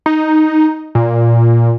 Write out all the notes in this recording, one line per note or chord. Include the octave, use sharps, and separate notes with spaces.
D#4
A#2